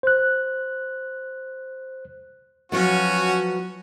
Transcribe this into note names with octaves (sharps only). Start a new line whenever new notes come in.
C5 F#6
F3 F#3 B3 C#4 F#4